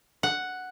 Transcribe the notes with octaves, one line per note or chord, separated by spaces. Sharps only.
F#5